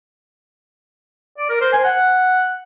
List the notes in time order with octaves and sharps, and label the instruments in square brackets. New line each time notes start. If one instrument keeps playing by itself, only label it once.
[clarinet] D5
A#4
C5
G#5
F#5